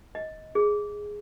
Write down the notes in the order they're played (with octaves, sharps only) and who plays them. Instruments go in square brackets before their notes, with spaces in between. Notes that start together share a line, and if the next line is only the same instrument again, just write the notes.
[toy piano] D#5
G#4